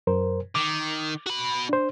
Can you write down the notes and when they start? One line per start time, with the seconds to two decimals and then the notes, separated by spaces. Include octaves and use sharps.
0.07 F#2 A#4 C5
0.55 D#3 D6
1.26 F#4 B5
1.69 D4 C5